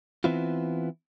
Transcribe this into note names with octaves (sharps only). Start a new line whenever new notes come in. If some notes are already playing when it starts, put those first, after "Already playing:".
E3 B3 C4 E4 F4